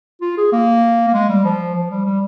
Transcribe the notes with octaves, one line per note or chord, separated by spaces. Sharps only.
F4
G#4
A#3
A#3
G#3
G3
F3
F3
G3
G3